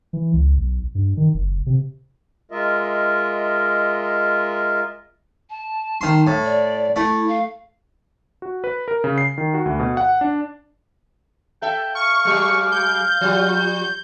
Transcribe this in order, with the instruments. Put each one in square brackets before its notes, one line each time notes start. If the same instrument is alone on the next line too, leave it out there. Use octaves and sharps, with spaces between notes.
[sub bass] E3
C#2
B1
G2
D#3
F#1
C3
[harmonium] G#3 F4 A#4 D#5 E5
[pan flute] A5
[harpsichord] D#3 C6
A2
[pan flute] D5
[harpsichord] A3 [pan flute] E4
[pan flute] F5
[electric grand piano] F#4
B4
A#4
C#3
C7
D#3
F#4
D2
B2
F#5
D4
[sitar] A4 E5 [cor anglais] G5
[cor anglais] F5 [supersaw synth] C#6
[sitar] F#3 G#3
[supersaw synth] G6
[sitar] F3 G3